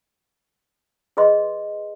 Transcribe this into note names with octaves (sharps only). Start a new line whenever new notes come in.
G#4 B4 D#5 C6